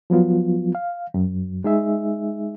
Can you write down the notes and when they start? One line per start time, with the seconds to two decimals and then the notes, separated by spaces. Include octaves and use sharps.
0.10 F3 F#3 B3 F4
0.75 F5
1.14 F#2 F#3
1.64 G#3 D#4 G#4 E5